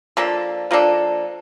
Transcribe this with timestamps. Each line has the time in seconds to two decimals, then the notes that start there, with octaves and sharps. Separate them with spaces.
0.17 F3 A#3 D4 A4
0.71 F3 A#3 D4 A4